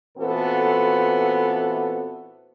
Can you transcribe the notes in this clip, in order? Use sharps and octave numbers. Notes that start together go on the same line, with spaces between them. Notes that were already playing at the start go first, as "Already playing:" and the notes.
A#2 E3 B3 C4 F#4 A4